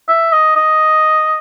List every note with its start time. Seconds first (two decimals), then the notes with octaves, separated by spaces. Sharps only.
0.08 E5
0.32 D#5
0.56 D#5